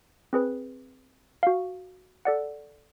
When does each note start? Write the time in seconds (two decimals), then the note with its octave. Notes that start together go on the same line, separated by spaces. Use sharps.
0.33 C4 G#4 B4
1.43 F#4 F5
2.25 A4 D5 F#5